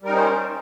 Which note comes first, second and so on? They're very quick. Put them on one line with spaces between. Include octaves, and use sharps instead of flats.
G3 A#4 D#4 C#4 C5